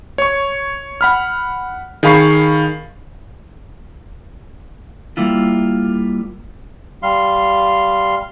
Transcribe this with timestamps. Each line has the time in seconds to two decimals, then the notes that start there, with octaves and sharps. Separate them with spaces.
0.18 C#5 C#6
1.01 F#5 B5 F6
2.03 D#3 G#4 F5 B5 C#6 C7
5.17 G3 A#3 E4 F4
7.03 G3 F5 C6